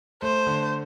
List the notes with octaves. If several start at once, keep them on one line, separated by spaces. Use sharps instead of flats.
A3 C5
D3